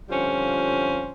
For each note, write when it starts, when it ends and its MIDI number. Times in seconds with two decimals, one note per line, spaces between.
0.09 1.12 41
0.09 1.12 50
0.09 1.12 55
0.09 1.12 61
0.09 1.12 65
0.09 1.12 72